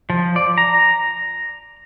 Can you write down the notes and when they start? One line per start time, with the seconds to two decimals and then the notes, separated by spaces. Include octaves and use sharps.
0.10 F3
0.36 D5
0.58 A#5